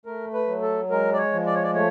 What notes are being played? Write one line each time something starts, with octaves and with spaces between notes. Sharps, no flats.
A3 A#4
B4
F#3
A4
G#3 A#4
D5
C#5
F3
D5
C#5
D5
A3 C#5